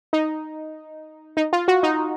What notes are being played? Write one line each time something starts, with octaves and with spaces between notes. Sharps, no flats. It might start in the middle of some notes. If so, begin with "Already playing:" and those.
D#4
D#4
F4
F#4
D#4